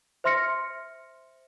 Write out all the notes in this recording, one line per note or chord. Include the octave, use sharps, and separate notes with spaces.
C5 E5 C6 F6 A#6 C#7